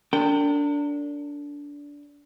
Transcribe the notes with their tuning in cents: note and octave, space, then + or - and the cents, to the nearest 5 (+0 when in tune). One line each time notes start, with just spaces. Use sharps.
D4 -20 A#4 -45 G5 +0